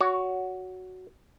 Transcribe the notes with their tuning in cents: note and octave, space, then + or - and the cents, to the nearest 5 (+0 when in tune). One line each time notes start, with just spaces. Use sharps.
F#4 +0 C#5 +25